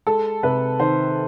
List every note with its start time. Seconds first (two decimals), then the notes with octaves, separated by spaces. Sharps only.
0.07 G#3 A4
0.43 C3 B4
0.79 D#3 C5